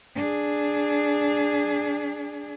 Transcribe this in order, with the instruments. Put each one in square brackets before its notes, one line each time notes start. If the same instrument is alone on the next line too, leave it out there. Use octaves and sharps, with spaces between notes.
[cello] D4 G#4